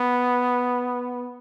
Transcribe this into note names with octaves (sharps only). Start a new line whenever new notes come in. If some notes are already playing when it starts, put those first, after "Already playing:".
Already playing: B3